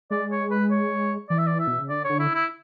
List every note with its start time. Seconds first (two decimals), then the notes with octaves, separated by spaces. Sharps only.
0.11 G#3 D5
0.31 C#5
0.51 B4
0.71 C#5
1.29 E3 D5
1.38 E5
1.47 D5
1.60 E5
1.67 B2
1.79 C#3
1.89 D3 D5
2.04 D3 C#5
2.19 E4
2.35 E4